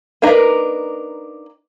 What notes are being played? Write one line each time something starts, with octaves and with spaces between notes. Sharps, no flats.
A#3 D4 D#4 A#4 B4